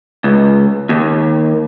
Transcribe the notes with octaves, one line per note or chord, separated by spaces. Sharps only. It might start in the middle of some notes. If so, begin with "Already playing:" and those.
C#2
D#2